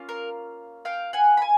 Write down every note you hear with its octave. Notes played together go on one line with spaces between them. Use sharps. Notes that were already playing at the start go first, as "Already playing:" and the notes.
Already playing: A#3 C#4 F4
A#4
F5 G5
F#5 G#5
B5
G#5